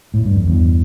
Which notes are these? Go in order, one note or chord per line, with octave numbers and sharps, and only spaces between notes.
A2
G2
F2
E2 G2